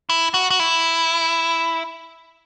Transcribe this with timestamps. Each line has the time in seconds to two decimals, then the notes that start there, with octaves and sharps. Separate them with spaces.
0.10 E4
0.34 F#4
0.51 F#4
0.60 E4